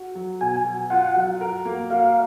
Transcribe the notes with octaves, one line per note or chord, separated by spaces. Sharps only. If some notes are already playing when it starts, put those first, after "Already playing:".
Already playing: F#4
F#3
B2 G#5
F#3
F4 F#5
F#3
A#4
A#3
F#4 F5